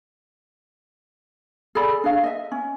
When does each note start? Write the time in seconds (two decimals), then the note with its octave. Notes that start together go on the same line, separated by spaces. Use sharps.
1.75 G#4 A4 D5 B5
2.04 D4 G#4 F5
2.23 D#5 E5
2.52 C#4